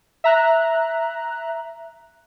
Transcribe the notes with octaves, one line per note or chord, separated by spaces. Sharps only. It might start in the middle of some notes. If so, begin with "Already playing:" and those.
E5 A#5 F#6